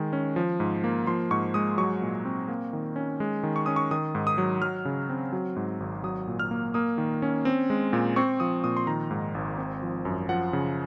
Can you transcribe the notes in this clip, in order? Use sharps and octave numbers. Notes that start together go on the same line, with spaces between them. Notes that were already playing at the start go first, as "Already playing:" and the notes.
Already playing: D#3 G#3
C#4
F3
G#2
A#3
F3 C6
G#2 C#6
G#3 D#6
F#3 C#6
A#2
C4
A#3
D#3
C#4
G#3
D#3
C#6
C#4 D#6
C#6
D#3 D#6
G#2
D#6
F#3
F#3 F6
C#3
C4
F#3
G#2
G#1
F#3 D#6
A#2
F6
A#3
A#3 D#6
D#3
C#4
C4
G#3
A#2
C4 C#6
F3 D#6
A#2 D#6
C6
D#3 A#5
G#2
G#1
C4
F3
F#2
F3 F#5
C#3